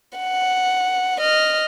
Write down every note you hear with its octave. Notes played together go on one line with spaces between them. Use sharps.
F#5
D#5 F6